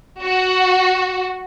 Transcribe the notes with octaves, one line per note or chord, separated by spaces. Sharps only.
F#4